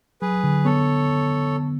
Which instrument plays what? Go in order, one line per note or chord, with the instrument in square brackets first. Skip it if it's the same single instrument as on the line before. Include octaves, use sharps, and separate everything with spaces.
[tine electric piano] F#3 [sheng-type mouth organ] G#4 B4
[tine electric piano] D3
[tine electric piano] B3 [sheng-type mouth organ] A4 C#5